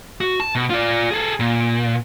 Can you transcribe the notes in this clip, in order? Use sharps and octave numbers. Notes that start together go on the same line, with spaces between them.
F#4
A5
B2
F4 D5
G#4 A4
A#2